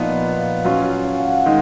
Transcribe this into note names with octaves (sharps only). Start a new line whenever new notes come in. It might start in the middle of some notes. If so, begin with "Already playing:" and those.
Already playing: A#2 F3 B3 D#4 F4 B4 D#5
F5
F#3 C#4 F4
G#5
F#5
F5
F#5
D#3 G#3